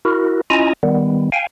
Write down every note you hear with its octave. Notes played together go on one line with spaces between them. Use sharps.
E4 F#4 A#4
C#4 E4 F4 D#5 G#5 A#5
D#3 G3 B3
F5 G5 G#5